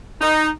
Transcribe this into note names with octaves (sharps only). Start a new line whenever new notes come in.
D#4